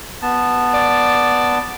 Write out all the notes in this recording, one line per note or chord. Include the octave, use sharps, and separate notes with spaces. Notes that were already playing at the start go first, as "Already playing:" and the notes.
B3 A5
D5